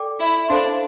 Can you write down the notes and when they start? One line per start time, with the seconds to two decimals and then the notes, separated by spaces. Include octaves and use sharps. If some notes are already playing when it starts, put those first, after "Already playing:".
Already playing: A4 D5 G5 D6
0.19 E4
0.49 D4 A4 C5 F5 C6